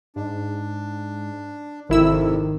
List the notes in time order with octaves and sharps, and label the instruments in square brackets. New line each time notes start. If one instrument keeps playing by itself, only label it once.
[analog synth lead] G#2 [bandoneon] D4
[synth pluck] G#1 E4 E6 [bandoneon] F2 C3 [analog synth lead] D#3